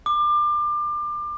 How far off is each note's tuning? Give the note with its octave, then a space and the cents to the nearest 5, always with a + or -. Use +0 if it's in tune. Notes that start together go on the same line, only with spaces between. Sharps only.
D6 +30